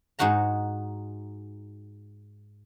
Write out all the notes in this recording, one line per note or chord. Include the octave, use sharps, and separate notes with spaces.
G#2 D#4 F#4 F#5 A#5